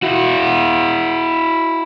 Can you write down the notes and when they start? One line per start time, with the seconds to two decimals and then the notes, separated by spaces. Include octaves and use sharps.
0.03 E4 F#4